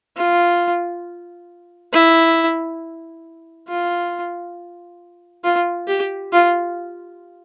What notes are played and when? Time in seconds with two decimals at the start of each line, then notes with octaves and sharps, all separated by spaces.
0.17 F4
1.93 E4
3.68 F4
5.44 F4
5.88 G4
6.33 F4